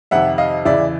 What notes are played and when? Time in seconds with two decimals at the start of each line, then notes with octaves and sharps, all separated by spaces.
0.11 F2 C3 D#3 E5 F#5
0.38 D#5 F5
0.65 E2 C#3 E3 D5 E5